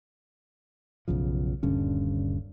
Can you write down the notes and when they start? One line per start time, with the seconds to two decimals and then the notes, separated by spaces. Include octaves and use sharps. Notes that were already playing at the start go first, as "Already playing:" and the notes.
1.08 B1 F#2 C#3 F3
1.63 D#1 G2 D3 C#4